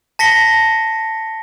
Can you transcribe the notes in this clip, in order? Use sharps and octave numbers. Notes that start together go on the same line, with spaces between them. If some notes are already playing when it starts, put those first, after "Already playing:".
A5 A#6 B6 C#7 G7